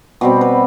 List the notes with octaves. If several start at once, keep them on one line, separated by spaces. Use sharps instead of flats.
B2 G3 C4 G4
B4